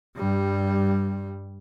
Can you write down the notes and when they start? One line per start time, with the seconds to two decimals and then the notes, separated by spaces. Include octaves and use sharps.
0.16 G2 G3